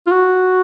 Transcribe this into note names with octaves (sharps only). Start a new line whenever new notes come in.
F4
F#4